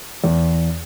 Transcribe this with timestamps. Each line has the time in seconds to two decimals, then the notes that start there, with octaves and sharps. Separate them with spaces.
0.24 E2